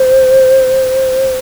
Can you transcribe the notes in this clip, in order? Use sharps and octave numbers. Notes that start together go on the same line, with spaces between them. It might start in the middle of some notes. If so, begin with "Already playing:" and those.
Already playing: C5